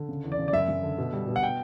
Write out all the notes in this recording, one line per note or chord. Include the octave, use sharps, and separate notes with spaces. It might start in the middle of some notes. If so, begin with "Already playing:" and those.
Already playing: D3
C#3
E2
D5
C#3
D5
F#2 E5
F#2
D3
B2
G3
B2
F#5
G5